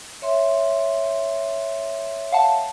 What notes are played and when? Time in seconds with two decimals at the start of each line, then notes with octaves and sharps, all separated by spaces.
0.22 C#5 E5 C6
2.32 F5 F#5 A5